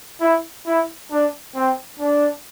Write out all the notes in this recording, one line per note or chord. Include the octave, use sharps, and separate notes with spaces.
E4
E4
D4
C4
D4